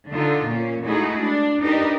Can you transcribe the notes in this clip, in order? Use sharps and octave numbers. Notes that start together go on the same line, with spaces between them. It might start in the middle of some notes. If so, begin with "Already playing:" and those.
D3 D#4 F4
A#2 C#4
G#3 A3 D#4 E4 F#4 G#4
D4
D4 D#4 G4 A#4 B4